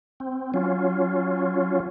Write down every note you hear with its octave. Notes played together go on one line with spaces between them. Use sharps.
C4
F#3 C#4 F4